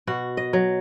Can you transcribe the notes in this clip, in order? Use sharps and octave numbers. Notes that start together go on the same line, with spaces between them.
B2 F#4
D#5
F#3